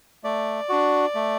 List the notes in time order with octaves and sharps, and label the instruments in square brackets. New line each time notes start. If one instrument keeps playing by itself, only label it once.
[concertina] A3 D5
D4 F#4
A3